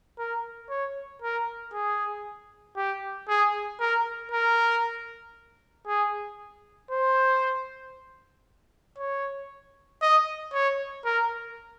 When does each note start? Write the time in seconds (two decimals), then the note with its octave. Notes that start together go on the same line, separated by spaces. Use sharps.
0.19 A#4
0.70 C#5
1.22 A#4
1.74 G#4
2.77 G4
3.29 G#4
3.80 A#4
4.32 A#4
5.87 G#4
6.91 C5
8.98 C#5
10.02 D#5
10.53 C#5
11.05 A#4